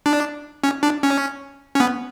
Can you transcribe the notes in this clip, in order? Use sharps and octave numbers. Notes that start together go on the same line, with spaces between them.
D4
C#4
D4
C#4
C#4
B3